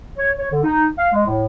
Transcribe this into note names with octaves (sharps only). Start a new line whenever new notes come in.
C#5
C#5
D3
D#4
F5
G#3
A2